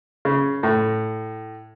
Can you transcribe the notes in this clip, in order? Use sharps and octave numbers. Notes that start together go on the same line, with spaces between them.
C#3
A2